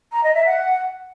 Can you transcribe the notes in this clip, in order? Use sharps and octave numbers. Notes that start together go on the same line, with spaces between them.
A#5
D#5
E5
F#5